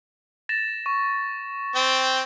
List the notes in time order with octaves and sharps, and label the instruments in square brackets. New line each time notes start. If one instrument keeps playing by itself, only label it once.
[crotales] A6 A#6 E7
C#6
[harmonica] C4 G5